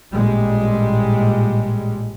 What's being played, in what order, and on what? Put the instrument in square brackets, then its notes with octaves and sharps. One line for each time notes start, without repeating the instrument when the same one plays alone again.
[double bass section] A1 A#2 G3 G#3